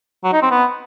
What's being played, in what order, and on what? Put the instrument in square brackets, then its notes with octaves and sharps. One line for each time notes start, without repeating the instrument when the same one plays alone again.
[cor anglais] F#3
D#4
C4
B3